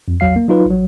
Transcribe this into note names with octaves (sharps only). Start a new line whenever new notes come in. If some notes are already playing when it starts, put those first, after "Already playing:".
F2
A1 E2 F#3 F5 C7
A#3
F#3 D#4 F4 B4
A1 F#3